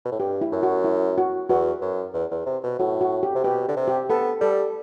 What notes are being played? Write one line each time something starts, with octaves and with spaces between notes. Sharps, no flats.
B2
A2
G2 G4
E4
F#2
F#4
E4
F#4
E2 F#4
F#2
E2
E2
C3
B2
A2 F#4
F#4
G4
C3
B2 G4
D3
C3
G4
B3 A4
G3 A4